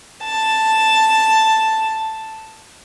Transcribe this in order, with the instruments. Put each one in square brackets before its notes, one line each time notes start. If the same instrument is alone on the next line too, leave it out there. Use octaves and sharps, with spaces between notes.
[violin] A5